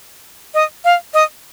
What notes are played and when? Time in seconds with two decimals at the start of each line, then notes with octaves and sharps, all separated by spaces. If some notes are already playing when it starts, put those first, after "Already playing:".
0.54 D#5
0.85 F5
1.14 D#5